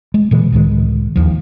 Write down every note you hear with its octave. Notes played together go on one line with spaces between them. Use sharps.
G#3
A#2 D3 E3 G#3
C#2 A2 D#3 G#3
E1 A#1 D#2 F3